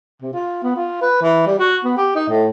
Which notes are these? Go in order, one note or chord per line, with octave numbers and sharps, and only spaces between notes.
C3
F4
B3
F4
B4
E3
G3
F#4
B3
G4
D#4
A2